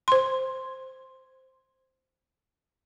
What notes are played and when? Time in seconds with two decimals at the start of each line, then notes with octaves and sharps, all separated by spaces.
0.08 C5 C6